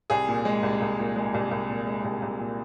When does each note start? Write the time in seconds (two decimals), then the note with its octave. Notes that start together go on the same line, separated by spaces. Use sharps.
0.10 C2 G#4
0.28 A#2
0.45 G#3
0.63 C2
0.81 C2
0.99 A#2
1.16 G#3
1.34 C2
1.51 C2
1.69 A#2
1.87 G#3
2.04 C2
2.22 C2
2.39 A#2